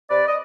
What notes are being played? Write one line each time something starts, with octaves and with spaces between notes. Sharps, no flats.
C3 B4 D5
D#5